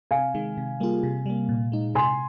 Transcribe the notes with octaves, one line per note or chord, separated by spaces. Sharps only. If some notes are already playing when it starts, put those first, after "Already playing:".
C3 F5 G#5
D#3 G#3
C3
G3 A#3 F4 G#4
C3
G3 A#3
A#2
G#3 D#4
C3 G#5 C6